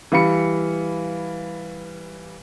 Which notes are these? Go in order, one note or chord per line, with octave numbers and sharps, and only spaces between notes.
E3 G3 F5 B5 C#7